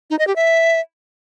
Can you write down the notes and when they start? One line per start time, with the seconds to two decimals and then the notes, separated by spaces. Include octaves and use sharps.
0.10 D#4
0.19 D#5
0.27 G4
0.36 E5